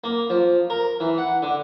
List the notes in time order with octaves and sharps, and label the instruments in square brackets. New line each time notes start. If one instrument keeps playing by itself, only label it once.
[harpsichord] A#3
F3
A#4
E3
F#5
D3